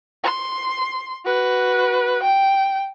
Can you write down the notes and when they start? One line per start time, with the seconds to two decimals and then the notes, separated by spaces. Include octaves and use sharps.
0.24 C6
1.25 F#4 B4
2.23 G5